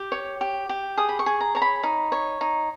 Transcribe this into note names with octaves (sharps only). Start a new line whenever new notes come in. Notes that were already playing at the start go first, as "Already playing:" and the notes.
Already playing: G4
C#5
G4
G4
G#4 D#6
B5
C#6
G#4
A#5
C#5 A#5
B5
D#4
C#5
D#4